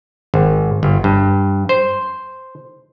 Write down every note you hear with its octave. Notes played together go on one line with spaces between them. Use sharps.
G#1
G1
G2
C5